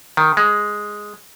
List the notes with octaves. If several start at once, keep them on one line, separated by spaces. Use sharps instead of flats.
D#3
G#3